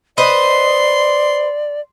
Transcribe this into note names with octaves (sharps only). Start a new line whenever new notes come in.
B4 C5 D5 D#5 C6